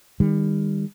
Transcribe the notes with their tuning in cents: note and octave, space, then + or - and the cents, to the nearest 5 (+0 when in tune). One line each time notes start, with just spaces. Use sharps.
D#3 -10 G3 +35